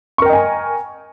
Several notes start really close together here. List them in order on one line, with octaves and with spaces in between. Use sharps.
C#6 A#4 G5 D#5 G#5